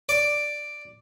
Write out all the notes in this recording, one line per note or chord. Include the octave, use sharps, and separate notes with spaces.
D5